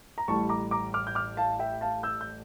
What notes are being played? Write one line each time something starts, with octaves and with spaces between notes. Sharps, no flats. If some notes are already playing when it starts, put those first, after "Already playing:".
A#5
A1 A2 G3 A5 C#6
A#5 D6
A#5 D6
D6 F6
G6
D6 F6
F5 A5
E5 G5
F5 A5
E6 G6
G6